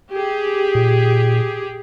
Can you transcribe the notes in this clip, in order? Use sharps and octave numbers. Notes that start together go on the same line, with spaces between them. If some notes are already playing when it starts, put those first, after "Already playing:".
G4 G#4
A#2